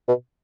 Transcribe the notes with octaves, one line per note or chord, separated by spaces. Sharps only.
B2